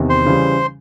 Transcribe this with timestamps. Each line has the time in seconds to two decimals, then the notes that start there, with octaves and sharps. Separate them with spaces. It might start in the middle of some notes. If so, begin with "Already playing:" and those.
Already playing: E2 C3 D#3
0.09 C5 C6
0.26 C#3 E3 G3